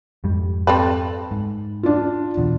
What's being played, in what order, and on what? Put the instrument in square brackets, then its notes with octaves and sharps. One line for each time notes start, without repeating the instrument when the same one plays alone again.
[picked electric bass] F2 G#2 G3
[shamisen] C4 A4 B4
[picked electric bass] G#2
[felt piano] D4 F4
[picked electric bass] E2 B2